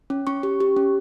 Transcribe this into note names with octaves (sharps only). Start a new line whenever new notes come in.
C#4
C#4 C#6
G4
G4
C#4